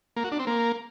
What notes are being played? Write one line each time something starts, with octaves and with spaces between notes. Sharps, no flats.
A#3
F#4
D4
C4
A#3